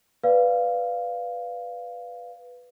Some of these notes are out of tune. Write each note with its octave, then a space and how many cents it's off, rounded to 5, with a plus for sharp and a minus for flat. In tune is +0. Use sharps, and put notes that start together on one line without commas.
B4 +0 D5 +0 F5 +0